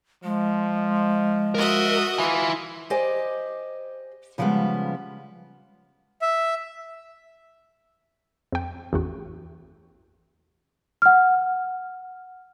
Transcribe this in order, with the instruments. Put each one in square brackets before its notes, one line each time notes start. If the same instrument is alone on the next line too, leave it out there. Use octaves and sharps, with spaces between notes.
[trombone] F3 [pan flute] G#3
[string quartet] F#4 D#5 E5 [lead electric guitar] A#4
[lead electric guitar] E4 G#5 [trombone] F4
[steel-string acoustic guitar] G4 C5 D5 D#5 G#5
C#3 F3 G3 G#3 B3
[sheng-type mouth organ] E5
[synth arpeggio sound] F2 G5
A1 E2 F#4
[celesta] F#5 F6